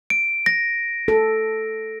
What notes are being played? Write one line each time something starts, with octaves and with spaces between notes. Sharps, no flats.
D7
A#6
A4